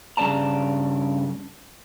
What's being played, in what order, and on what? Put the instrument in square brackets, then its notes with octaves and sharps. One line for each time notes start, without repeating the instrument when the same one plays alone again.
[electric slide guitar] G2 C#3 D5 A5 A#5